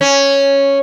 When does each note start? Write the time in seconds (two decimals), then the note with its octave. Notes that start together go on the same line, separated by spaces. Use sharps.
0.01 C#4